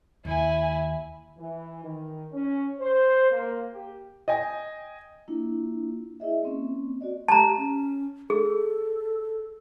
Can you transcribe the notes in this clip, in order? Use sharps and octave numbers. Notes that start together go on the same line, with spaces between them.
D#2 E4 G#5
E3
D#3
C#4
C5
A#3
G4
D#5 G5 G#5
A#3 D4 E4 F4
E4 G#4 D#5 E5
A#3 C4 C#4
F#4 D5 D#5
G4 A5 A#5
C#4
G#4 A4